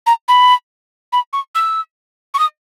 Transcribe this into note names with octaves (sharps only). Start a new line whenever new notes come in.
A#5
B5
B5
C#6
E6
C#6
D#6